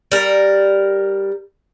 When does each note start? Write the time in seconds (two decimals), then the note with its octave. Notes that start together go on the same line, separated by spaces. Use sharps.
0.12 G3 A#4